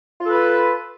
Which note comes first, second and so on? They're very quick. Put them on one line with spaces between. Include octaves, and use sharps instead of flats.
F4 A4 B4